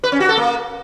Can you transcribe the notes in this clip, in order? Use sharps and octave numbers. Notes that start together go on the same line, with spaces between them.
B4
C#4
F#4
A4
A#3